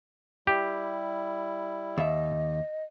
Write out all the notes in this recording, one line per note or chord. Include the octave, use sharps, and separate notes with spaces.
G3 E4 G4
D#2 D#5 E5